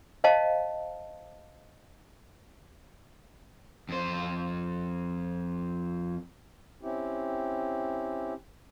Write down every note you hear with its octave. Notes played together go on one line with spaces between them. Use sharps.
C5 D#5 F5 A5
F2 C5
C4 C#4 E4 G4